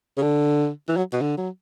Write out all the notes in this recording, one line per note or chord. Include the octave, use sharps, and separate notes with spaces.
C#3
D3
E3
F#3
B2
D3
F#3